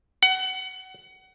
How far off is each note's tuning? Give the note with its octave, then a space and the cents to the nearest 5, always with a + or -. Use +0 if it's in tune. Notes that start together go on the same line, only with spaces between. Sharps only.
F#5 +25